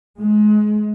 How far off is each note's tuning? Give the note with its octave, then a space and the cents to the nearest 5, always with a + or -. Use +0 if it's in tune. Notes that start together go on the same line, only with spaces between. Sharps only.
G#3 +25